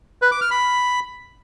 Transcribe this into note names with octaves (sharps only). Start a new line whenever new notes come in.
B4
D6
F6
B5